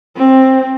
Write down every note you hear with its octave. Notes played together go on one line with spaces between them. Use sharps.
C4